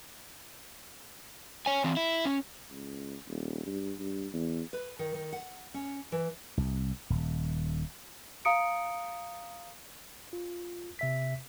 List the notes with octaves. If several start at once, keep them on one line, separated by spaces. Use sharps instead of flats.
C#5 G#5
E3 C4
E4
C#4
C#2
D#1
G2
G2
E2
B4
D#3
D#3
F#5
C#4
E3
C2
D#1
F5 A#5 D#6 C#7 D7
F4
C3 E5 B6